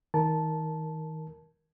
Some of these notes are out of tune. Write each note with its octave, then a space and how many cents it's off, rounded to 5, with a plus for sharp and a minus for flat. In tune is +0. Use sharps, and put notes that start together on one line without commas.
D#3 +35 A#4 +0 A5 -10